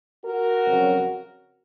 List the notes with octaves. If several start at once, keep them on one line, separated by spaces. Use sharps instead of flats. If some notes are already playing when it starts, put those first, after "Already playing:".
F#4 A#4
F2 C#3 F#3 C4